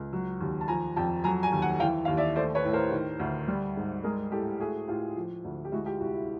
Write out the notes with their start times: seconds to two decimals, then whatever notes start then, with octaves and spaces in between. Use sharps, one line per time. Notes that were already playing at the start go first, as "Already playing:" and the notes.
Already playing: C#2
0.13 F#3
0.41 D#2
0.61 A5
0.68 F3 G#5 A#5
0.96 F2 G5 A5
1.24 F#3 G#5 A#5
1.43 G#5 A#5
1.52 D#2
1.62 F#5 G#5
1.80 E3 F5 G5
2.05 D#2 F5
2.17 D5 E5
2.36 A3 C5 D5
2.55 B4 C#5
2.65 A2
2.73 A#4 C5
2.92 D#3
3.20 D2
3.48 G3
3.77 G#2
4.04 G#3 G#4 A#4
4.32 A2 G4 A4
4.60 A3 F#4 G#4
4.88 A2 F4 G4
5.17 F3
5.44 D2
5.65 G4
5.72 G#3 E4 F#4
5.86 F4 G4
6.00 C2 E4 F#4
6.14 E4